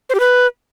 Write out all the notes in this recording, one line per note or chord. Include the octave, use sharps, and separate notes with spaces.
C5
G4
B4